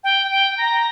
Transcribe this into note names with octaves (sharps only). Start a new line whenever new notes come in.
G5
G5
A#5